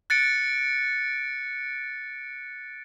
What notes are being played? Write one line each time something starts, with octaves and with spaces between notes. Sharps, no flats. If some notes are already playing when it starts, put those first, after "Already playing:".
F#6 A6 C#7 D7